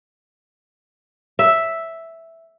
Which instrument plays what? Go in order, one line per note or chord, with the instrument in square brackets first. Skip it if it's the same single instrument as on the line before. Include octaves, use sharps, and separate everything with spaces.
[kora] E5